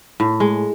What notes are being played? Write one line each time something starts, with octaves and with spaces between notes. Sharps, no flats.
A2
G#3